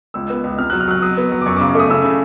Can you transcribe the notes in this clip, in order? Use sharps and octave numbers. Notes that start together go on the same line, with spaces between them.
C#2 E6
B3
C#2
C3 F6
F#3 F#6
F6
F#3 F#6
F#3 D#6
B3
F#3
D6
F#2 C#6
D6
C#3
D6
A3 D#6
C#3 E6
C#3